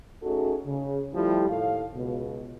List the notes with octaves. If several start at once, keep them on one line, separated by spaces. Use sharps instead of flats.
A3 C#4 D#4 F#4 G#4 A4
C#3
F3 G3 A3 E4 G4
D#2 A2 A3 F5
C#2 B2